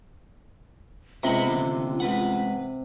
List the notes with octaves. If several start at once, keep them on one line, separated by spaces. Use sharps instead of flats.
C#2 C3 B3 F4 D#5 B5
A1 D#2 D3
G#2 B4 F#5